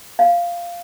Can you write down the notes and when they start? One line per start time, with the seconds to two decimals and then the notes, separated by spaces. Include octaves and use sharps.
0.19 F5